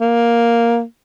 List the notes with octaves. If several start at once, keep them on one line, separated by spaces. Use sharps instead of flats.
A#3